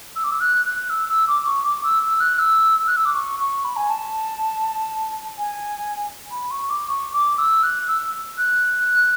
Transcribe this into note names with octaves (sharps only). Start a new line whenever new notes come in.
E6
D6
E6
F#6
F#6
E6
E6
D6
C#6
D6
E6
E6
F#6
E6
F#6
E6
D6
C#6
C#6
B5
G#5
A5
G#5
B5
C#6
D6
C#6
D6
E6
F#6
E6
F#6